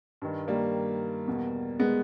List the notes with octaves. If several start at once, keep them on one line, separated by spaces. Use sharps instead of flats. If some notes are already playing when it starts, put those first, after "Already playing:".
G2 D#3
G3 A#3
E2 B2
G#3 B3